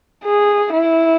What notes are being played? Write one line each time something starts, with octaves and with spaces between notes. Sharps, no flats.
G#4
E4